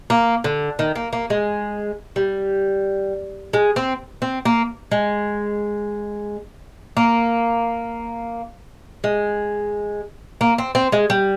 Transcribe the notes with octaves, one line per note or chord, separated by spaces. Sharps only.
A#3
D3
D#3
A#3
A#3
G#3
G3
G#3
C4
C4
A#3
G#3
A#3
G#3
A#3
C4
C4
G#3
G3